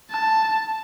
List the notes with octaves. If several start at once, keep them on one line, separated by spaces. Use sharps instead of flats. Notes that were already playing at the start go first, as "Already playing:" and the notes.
A5